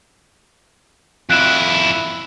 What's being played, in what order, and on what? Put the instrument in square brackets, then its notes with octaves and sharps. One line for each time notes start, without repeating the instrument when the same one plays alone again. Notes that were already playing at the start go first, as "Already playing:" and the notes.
[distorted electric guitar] F2 E4 [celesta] F#6 D7 E7